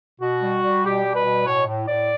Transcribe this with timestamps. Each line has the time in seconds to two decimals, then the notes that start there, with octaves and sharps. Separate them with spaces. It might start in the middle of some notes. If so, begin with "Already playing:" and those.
0.21 B2 F#4
0.42 G3
0.63 G3
0.84 B2 G4
1.05 G3
1.15 B4
1.25 B2
1.46 A2 C#5
1.67 A2
1.88 A2 D5